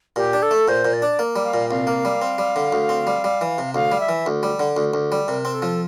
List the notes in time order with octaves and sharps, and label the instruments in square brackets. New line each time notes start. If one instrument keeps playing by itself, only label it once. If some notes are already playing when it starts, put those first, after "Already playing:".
[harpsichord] A#2 [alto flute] G4
[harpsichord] D4
[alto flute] A4
[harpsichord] A3
[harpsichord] A#2 [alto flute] C5
[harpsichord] A#2
[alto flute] D5
[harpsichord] D4
A#3
G3
[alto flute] F5
[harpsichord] A#2
[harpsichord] C2 [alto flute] F5
[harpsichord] A#3
G3
C4
G3
D3
D2
C4
G3
G3
E3
C3
[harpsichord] D2 [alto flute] F5
[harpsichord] G3
[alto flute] E5
[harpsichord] E3
D2
G3
D3
D2
D2
G3
[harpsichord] C3 [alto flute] A#4
[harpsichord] C4
[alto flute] A4
[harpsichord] F3